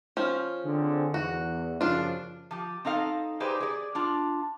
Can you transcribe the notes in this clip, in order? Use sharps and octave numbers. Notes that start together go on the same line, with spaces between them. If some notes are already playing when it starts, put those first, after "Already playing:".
F3 C#4
D3 C4 G#4
E2 F#4
F#2 C#3 F3 D4 F4
F3 G4
C4 D#4 A4 F5
D#4 G4 G#4 B4 C5 D5
G#4 D5
D4 F4